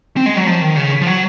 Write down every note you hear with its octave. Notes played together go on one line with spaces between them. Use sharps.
C4
G#3
F#3
F3
D#3
C#3
F3
F#3